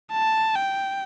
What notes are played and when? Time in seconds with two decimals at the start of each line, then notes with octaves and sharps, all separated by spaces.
0.12 A5
0.56 G5